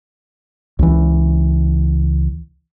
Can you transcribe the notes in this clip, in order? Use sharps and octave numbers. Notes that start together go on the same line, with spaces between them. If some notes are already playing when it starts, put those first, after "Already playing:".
C#2 E3